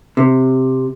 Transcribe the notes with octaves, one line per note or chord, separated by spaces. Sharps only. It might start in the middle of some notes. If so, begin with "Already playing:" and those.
C3